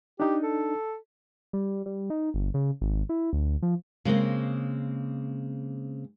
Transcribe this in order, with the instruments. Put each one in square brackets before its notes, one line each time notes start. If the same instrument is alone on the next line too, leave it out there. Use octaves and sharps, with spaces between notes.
[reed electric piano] D4 D#4 [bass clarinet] G4
[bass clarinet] A4
[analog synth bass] G3
G3
D#4
G1
C#3
G#1
E4
D2
F3
[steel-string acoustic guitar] C#3 G#3 A#3 C4